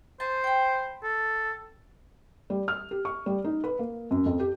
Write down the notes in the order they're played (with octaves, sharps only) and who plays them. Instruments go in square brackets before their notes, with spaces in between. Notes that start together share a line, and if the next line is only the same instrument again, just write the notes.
[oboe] C5 [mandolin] G#5 A5
[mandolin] G5 B5
[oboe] A4
[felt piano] G3
F6
G4
C#6
G3
D#4
B4
A#3
F#2
F2
G4